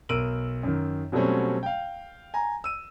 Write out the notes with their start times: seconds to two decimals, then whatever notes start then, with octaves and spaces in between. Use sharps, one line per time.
0.09 B1 A#4 E6 D7 D#7 F#7
0.63 F#2 D#3
1.12 B2 F#3 G3 A3 C4 C#4
1.63 F5 G5
2.34 G#5 A#5
2.64 E6 D#7